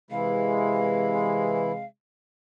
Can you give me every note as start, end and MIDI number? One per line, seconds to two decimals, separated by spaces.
0.11 1.85 48
0.11 1.72 52
0.11 1.85 56
0.11 1.72 64
0.11 1.85 77